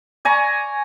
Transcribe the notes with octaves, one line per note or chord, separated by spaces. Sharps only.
D5 G#5 A#5 C#6